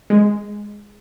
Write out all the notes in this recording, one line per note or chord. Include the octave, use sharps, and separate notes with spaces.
G#3